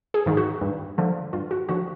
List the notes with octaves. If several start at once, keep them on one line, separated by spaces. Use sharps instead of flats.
G#4
G#2 D#3
F#4
G2
D3 F3
G2 F4
F#4
D3 F3 F#4